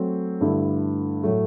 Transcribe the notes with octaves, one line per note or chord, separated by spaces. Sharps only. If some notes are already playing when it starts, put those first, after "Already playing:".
Already playing: F#3 A3 C4
G2 D3 A3 E4
A2 F#3 A3